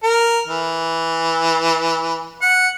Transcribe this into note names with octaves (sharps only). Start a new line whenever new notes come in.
A#4
E3
F#5